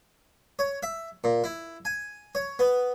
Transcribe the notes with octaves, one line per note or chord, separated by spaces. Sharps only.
C#5
E5
A#2
E4
G#5
C#5
B3